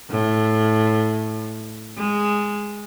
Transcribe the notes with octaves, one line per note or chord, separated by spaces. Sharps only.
A2
G#3